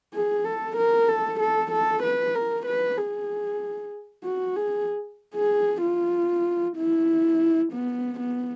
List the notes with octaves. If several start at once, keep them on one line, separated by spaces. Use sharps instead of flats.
G#4
A4
A#4
A4
A4
A4
B4
A#4
B4
G#4
F#4
G#4
G#4
F4
E4
B3
B3